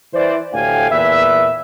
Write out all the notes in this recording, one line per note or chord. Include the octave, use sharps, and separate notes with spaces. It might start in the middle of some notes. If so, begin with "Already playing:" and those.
E3 C5 D5
D2 A2 G4 F5 G5 G#5
E2 A#2 B4 E5